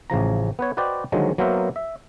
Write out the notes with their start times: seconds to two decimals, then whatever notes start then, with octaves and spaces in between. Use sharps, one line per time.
0.10 A1 C#3 F3 A#5
0.59 B3 B4 C#5
0.77 F#4 B4 C5 D5 D#5 G5
1.12 D3 D#3 F3 F#3 G#3
1.38 F#3 A#3 B3 A#4 C5 E5
1.76 E5